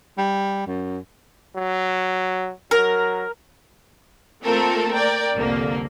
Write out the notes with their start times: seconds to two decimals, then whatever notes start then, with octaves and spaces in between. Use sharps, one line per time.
0.18 G3
0.67 F#2
1.55 F#3
2.71 F#3 A#4
4.43 A3 A#3 C4 F4 A4 A#4
4.93 A#4 D5 G5
5.35 C2 F2 D3 A#3